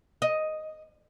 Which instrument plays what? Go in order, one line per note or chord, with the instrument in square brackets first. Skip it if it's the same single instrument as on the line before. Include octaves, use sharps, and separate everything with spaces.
[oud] D#5